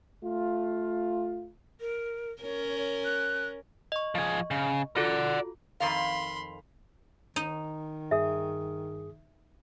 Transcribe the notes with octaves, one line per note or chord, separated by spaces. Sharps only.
A3 F4
A#4
C#4 A#4 C#5
F#6
D#5 C#6
F3 G#4
C#3
F4 F#4 A4 D5 F#5
F2 D#3 F5 B5 C6
D#3 D#4
G2 G#4 E5 D#6